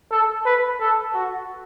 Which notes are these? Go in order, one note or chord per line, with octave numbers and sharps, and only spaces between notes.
A4
B4
A4
F#4